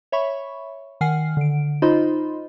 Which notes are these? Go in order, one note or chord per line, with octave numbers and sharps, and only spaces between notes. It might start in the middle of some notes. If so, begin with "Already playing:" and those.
C#5 E5 B5 C#6
D#3 F#5 G#5 F6 C7
D3 D7
D#4 F4 C5 D#5 B5 C6